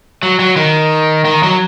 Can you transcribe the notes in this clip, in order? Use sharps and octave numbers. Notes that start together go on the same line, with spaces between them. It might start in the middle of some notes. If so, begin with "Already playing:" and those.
F#3
F#3
D#3
D#3
F#3